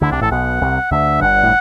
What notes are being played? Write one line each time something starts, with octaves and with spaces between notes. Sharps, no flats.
D2 D3 E4
C2 C3 D4
A1 A2 A4
B1 B2 F#5
C2 C3
D2 D3 E5
G1 G2 F#5
A2